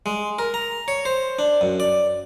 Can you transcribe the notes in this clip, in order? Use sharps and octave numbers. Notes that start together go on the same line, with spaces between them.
G#3
A#4
A#5
C#5
C5
D4
F#2
D5